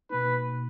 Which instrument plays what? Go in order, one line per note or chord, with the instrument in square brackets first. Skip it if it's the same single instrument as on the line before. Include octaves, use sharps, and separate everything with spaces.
[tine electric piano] B2 A#3 D#4 [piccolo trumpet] B4